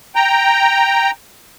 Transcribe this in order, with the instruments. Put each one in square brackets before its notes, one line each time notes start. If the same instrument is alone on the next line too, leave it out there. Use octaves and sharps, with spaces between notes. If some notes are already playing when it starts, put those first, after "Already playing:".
[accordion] G5 A#5